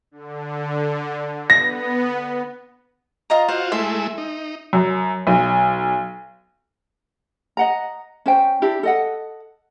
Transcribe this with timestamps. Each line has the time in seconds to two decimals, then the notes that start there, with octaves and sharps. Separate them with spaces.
0.11 D3
1.50 B3 A#6
3.30 F4 D#5 A#5
3.49 F4 F#4 C5
3.72 G#3 A3 E4 E5 C6
4.18 D#4
4.73 F#2
5.27 B1
7.57 D#5 F#5 A#5
8.26 C#4 C5 G5
8.62 D4 E4 G4
8.83 A4 D#5 F#5